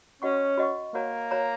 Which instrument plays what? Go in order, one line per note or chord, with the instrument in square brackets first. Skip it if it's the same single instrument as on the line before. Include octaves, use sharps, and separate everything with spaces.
[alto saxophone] C#4 [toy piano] F#4 D#5 F#5 C#6
[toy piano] F#4 D#5 F#5 C#6
[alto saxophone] A#3 [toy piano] F#4 C#5 F#5 A#5
[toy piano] F#4 C#5 F#5 A#5